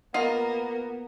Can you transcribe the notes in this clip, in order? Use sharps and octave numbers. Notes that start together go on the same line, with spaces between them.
A#3 B3 D#4 F4 D#5 F#5